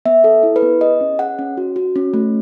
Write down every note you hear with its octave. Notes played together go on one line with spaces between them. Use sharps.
B3 E5
A4
E4
B4
B3
G#4 D#5
C#4
G#4 F#5
C#4
F#4
F#4
C#4
A3